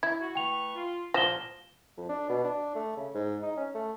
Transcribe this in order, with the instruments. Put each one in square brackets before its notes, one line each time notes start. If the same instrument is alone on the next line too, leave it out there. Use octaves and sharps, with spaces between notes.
[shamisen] E4 [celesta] G#6
[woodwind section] F#4
[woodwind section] A3 B4 C#6 [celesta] G5 F7
[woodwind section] F4
[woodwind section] D#2 A#2 [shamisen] F3 [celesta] A#6 E7 G7
[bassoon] F2
D4
B2
D4
A3
C#3
G#2
D#4
C#4
A3